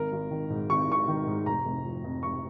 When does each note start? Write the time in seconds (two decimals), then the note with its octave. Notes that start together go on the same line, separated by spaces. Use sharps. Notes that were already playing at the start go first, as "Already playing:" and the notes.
Already playing: G#1 A#4
0.13 G#1
0.31 D#3
0.50 G#2
0.70 G#1 C#6
0.89 G#1 C#6
1.08 D#3
1.27 G#2
1.46 F1 A#5
1.65 F1
1.85 F3
2.04 F2
2.23 F1 C#6